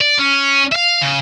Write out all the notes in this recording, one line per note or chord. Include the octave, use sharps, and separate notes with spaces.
D5
C#4
E5 F5
C#3